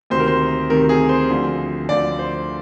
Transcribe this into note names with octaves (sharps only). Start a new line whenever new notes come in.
D2 C3 D#3 C5
A#4
C5
D2 C3 D#3 A#4
G#4
C5
D2 D3 F3
D2 D3 F3 D5
C5